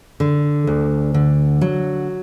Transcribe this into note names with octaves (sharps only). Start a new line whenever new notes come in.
D3
D2
D3
F#3